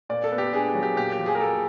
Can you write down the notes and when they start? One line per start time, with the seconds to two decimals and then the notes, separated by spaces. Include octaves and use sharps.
0.09 A#2 D5
0.24 A4
0.32 B3
0.38 G4
0.53 D4 G#4
0.68 G4
0.75 F#3
0.83 G4
0.97 A#2 G4
1.12 G4
1.19 F3
1.26 G#4
1.35 A#4
1.41 A#2 A4